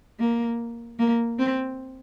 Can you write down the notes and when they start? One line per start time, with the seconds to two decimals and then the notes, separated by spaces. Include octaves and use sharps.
0.20 A#3
0.99 A#3
1.39 C4